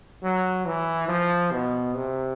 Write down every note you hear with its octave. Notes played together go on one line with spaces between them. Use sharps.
F#3
E3
F3
B2
C3